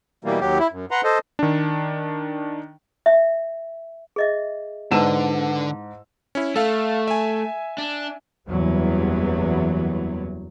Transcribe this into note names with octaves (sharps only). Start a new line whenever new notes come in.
B2 E3 G3 A#3
D#2 F#3 G4
E4
F#2
B4 F#5 A#5 C6
A4 C5 D#5
D#3 D4
E5
G#4 D#5 E5
G#2 D3 E4 B4 F#5 A5 E6 E7
C#4 E4
A3 A4 F5
E5 G#5
D4
F#1 E2 E3 F#3 G3 B3